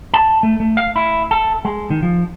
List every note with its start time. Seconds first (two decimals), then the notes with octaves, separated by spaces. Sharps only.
0.14 A5
0.43 A3
0.60 A3
0.77 F5
0.96 E4
1.31 A4
1.65 G#3
1.90 D#3
2.03 F3